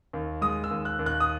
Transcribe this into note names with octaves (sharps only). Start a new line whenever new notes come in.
D#2
G#3 D#6
E6
D#2
F#6
D#2
F#6
D#6